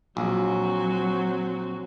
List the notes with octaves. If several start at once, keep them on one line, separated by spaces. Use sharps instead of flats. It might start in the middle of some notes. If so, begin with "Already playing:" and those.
A#1 F#3 C4 F#4